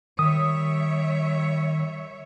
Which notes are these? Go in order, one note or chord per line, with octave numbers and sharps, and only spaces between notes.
D#3 G3 C#5 E5 D#6